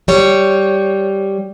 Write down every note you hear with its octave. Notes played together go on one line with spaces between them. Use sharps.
G3 C#5